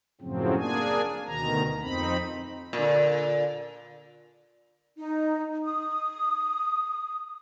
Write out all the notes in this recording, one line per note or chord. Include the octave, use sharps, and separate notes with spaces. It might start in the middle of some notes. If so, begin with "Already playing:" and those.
F#2 A2 C#3 F3 F#3 C4
A#3 D4 G#4 G#5
D2 B2 D#3 A#5
F2 C4 D#4 B5
A#2 D3
D#4
D#6